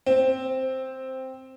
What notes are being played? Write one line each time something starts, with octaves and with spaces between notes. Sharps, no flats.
C4